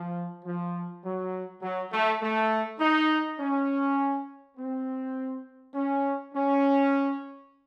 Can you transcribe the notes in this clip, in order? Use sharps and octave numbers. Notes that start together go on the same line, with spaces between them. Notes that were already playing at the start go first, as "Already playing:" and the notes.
Already playing: F3
F3
F#3
F#3
A3
A3
D#4
C#4
C4
C#4
C#4